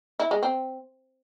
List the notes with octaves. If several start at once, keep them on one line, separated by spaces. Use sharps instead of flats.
E4
G#3
C4